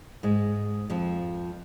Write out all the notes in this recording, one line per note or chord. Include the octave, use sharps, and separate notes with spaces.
G#2 G#3
F2 F3